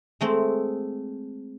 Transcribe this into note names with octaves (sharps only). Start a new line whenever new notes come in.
G#3 A3 C4